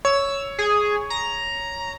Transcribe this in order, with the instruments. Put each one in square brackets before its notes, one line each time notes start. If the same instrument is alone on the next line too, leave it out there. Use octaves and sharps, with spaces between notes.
[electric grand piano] C#5 [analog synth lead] E6
[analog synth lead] G#4
A#5